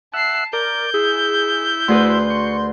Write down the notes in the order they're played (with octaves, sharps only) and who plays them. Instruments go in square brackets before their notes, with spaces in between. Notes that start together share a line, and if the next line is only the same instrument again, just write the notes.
[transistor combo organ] E5 F#5 [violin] A5 C7
[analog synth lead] A#4 [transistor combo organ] D5 [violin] G6
[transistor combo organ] E4 [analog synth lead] G#4
[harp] D2 G#4 B4 [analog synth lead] C6
[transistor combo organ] C#6